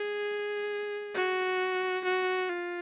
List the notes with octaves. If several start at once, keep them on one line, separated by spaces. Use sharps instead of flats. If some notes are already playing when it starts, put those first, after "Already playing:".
Already playing: G#4
F#4
F#4
F4